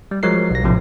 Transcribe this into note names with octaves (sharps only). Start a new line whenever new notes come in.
G3
F3 F#3 G#3 A#4 C7
B1 A#6
A#1 A2 C3 F3